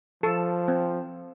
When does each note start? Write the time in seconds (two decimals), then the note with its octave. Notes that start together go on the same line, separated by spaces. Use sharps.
0.23 F3 A4
0.68 C4